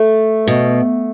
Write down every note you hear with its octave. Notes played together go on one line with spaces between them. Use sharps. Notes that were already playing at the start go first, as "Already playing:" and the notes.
Already playing: A3
B2